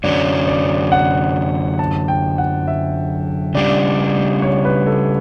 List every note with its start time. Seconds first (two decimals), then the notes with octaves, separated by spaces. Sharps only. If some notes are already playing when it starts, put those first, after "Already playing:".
0.04 F#2 D3 F#3 C#4 D5
0.48 D5
0.92 F#5
1.79 A5
2.08 G5
2.38 F#5
2.68 E5
3.55 C#3 G3 D4 D5
4.42 C#5
4.65 B4
4.87 A4